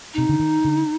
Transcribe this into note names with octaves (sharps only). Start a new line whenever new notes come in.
C3 D#4
D3
D#3
D3